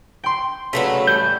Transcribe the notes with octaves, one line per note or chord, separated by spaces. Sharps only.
G5 C6
C#3 F#3 A3 A#4 B4 B6
A1 G3 G6